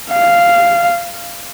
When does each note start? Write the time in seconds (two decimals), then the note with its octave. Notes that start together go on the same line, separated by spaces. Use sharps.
0.12 F5